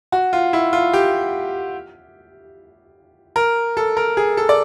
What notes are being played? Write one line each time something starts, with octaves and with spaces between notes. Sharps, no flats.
F#4
F4
E4
F4
G4
A#4
A4
A#4
G#4
A4
D5